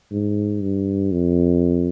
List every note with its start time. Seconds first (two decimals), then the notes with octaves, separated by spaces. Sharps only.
0.12 G#2
0.62 G2
1.12 F2